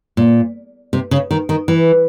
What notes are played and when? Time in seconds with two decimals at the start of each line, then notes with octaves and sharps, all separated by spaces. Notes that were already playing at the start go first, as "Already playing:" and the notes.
0.17 A#2
0.93 C3
1.11 C#3
1.31 D#3
1.49 D#3
1.68 E3